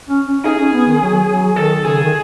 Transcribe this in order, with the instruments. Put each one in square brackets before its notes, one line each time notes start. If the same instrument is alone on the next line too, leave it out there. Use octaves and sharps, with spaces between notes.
[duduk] C#4
C#4
[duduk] D#4 [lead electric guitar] G#4
[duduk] C#4
B3
D#3
F#3
F#3
[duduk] D#3 [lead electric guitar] A4
[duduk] C#3 [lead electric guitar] G#4
[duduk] D#3